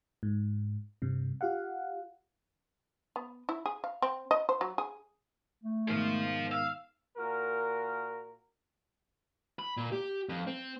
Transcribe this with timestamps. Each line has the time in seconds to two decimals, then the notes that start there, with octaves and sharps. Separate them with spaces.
0.23 G#2
1.02 G2 C3
1.41 F4 G4 F5 F#5
3.16 B3
3.49 E4
3.66 G#4
3.84 F5
4.02 C4
4.31 D#5
4.49 C5
4.61 F#3
4.78 G#4
5.64 A3
5.88 G#2 B2 D#3 C5 F5
6.52 F5 E6
7.17 A#2 F#4 A#4
9.59 B5
9.77 A#2
9.92 G4
10.29 F2
10.47 C4